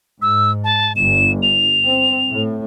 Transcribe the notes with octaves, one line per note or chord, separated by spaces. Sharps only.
G#2 E6
A5
G1 E7
F7
C4
A2